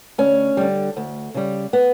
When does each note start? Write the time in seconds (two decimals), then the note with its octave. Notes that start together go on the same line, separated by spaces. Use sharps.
0.18 D2 C#4
0.57 D3 G3
0.97 D2
1.34 C#3 G3
1.73 B3